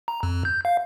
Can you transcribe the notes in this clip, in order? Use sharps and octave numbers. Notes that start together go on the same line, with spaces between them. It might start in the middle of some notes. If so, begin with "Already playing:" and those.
A#5
F2
G6
F5